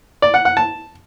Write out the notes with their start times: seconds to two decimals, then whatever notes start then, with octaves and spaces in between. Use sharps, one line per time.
0.22 D5
0.34 F#5
0.45 F#5
0.57 A5